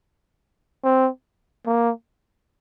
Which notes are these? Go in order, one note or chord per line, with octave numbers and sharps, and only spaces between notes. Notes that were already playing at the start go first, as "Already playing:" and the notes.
C4
A#3